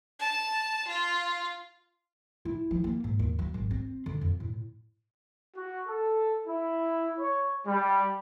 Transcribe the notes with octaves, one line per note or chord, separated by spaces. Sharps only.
A5
F4
E4
F3
A#3
G#2
D#2
F#3
G#1
C4
D3
F2
A2
F#4
A4
E4
C#5
G3